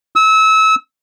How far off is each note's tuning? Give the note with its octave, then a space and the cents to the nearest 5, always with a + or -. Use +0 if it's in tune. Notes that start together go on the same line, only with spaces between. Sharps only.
E6 -30